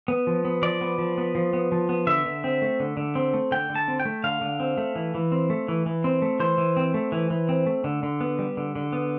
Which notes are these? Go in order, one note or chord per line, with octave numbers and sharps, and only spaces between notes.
B3
F3
B3
F3 D5
B3
F3
B3
F3
B3
F3
B3
D3 E5
D3
C4
A3
D3
D3
C4
A3
D3 G5
D3
A5
C4
G5
A3
D3 F5
D3
C4
A3
E3
E3
C4
A3
E3
E3
C4
A3
E3 C5
E3
C4
A3
E3
E3
C4
A3
D3
D3
B3
G3
D3
D3
B3